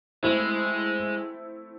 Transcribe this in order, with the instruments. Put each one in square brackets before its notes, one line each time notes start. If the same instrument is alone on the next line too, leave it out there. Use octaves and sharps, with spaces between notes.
[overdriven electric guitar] G#3 [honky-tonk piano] A3 C4 E4